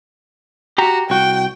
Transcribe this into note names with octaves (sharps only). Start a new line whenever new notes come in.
F#4 G4 A#5
C2 F#4 G5